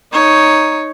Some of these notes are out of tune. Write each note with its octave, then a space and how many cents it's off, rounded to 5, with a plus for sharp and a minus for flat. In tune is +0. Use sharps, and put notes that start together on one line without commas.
D#4 +0 C#5 +0